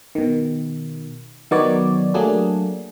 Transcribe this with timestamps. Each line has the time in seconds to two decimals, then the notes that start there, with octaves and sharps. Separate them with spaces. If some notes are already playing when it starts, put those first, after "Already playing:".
0.15 B2 D#3
1.51 D#3 F#3 B3 D#4 C#5 D5
2.14 F#3 A3 A#3 D4 G#4